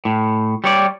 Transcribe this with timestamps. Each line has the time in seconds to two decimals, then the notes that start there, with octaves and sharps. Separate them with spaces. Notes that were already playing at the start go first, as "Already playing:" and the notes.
0.05 A2
0.64 G3 C#5 D5